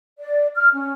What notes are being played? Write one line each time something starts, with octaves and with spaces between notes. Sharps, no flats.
D5
F6
C#4